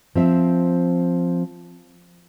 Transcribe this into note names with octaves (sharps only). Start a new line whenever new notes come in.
F3 C4 E5